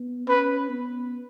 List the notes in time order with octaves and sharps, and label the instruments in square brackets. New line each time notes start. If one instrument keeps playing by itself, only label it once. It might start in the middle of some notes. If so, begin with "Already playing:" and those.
Already playing: [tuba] B3
[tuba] C#4 [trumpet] B4
[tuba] B3